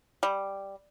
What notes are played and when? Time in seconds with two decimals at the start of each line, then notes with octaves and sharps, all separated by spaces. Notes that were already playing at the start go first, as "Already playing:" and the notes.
0.23 G3